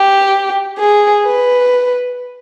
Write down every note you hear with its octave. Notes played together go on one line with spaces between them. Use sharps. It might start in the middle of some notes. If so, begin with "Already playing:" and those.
Already playing: G4
G#4
B4